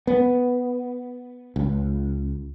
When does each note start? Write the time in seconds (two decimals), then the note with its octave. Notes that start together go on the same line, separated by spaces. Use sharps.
0.07 B3
1.56 C#2